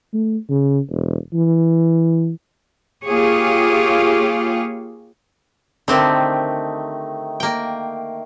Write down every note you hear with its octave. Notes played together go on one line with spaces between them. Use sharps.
A3
C#3
E1
E3
A#3 F4 G4 G#4 C#5
D3 D#3 A3 C4 G4
A#3 G5